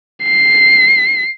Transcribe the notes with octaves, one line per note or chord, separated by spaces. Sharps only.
C7